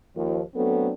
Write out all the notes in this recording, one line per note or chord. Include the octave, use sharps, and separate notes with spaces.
D#2 F3
F#3 A3 B3 C4 D4 A4